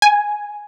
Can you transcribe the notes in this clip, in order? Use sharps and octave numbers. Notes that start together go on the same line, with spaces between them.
G#5